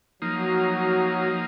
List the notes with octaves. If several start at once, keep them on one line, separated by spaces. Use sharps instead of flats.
F3 F#3 A#3 D#4